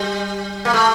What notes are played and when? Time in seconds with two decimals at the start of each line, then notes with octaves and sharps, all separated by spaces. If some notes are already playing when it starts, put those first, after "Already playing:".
Already playing: G3
0.65 A#3
0.73 A3